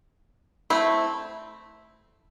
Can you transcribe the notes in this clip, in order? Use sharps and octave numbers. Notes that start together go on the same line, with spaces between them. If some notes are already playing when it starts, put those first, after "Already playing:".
A3 C4 E4